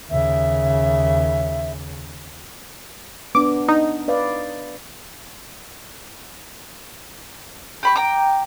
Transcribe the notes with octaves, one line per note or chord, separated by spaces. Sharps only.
D#2 C#3 E5
B3 D4 D6
D#4
B4 D5 F5
G4 B5 C#6
G5 A#5 D6